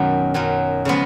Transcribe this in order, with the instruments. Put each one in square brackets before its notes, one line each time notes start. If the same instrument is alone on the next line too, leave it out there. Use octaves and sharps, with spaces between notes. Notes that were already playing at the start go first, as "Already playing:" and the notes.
Already playing: [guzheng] F#2 B2 D#3 F#3
F#2 D#3 F#3
C#3 F3 G#3 B3